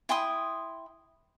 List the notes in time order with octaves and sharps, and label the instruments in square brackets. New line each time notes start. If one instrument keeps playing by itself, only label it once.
[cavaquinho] E4 G5 C6 D#6